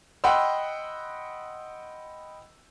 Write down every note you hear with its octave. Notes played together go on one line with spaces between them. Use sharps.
D#5 F#5 G5 B5 C6 E6